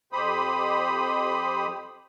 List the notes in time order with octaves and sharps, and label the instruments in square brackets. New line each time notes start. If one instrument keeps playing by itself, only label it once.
[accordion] F2 G4 C5 B5 D#6